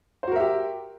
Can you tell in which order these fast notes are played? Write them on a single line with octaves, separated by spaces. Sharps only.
C5 F#4 A#4 E5 G4